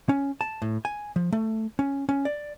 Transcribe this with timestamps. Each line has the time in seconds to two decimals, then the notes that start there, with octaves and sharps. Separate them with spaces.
0.09 C#4
0.41 A5
0.62 A2
0.85 G#5
1.16 F3
1.32 A3
1.79 C#4
2.09 C#4
2.25 D5